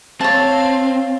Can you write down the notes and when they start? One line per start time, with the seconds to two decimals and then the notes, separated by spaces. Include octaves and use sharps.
0.21 C4 C5 C#5 F5 A5